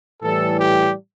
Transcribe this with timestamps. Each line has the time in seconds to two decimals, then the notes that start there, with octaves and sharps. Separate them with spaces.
0.23 A2 E3 G3 A4
0.58 G4